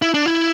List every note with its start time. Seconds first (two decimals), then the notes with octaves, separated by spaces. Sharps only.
0.02 E4
0.14 D4
0.26 E4